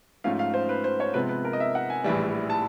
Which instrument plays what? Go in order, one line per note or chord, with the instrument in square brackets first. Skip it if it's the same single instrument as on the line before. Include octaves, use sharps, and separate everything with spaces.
[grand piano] G#2 F3 A3 C#4 [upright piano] F5
[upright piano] F5
C5
B4
C5
C#5
[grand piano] C3 F3 G#3 B3 [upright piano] B4
[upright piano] B4
A#4
D#5
E5
F#5
G#5
[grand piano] A#1 A2 E3 G3
[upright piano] A5